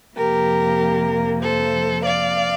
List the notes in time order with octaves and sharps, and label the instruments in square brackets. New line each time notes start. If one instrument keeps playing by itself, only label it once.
[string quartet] F2 C3 F3 A#3 G4 A#4
A4 C5
D5 F5